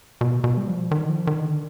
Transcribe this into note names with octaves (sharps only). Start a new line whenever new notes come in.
B2
B2
G3
F3
D#3
F3
D#3
D3